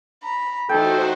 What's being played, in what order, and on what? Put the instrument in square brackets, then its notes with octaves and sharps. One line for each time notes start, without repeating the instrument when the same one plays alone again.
[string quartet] A#5 B5
[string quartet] E3 A3 D#4 [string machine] F#4 C5 [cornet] A4 [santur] G5